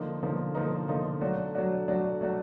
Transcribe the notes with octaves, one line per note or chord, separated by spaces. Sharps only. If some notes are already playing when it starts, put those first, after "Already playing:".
Already playing: D3 F3 A#3 D#4
D3 F3 A#3 D#4
D3 F3 A#3 D#4
D3 F3 A#3 D#4
F#3 A3 D4 F#4
F#3 A3 D4 F#4
F#3 A3 D4 F#4
F#3 A3 D4 F#4